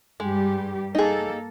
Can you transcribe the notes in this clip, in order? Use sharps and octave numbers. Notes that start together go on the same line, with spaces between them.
G2 G3 G#3 G4
A#3 D#4 G#4 A4